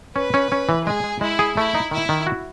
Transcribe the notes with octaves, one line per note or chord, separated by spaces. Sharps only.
C#4 B4
C#4
C#4
E3
G#3 G#4
G#3
G#3 E4
G#4
A3 E4
D#4
D#3 E4
D#3
F#4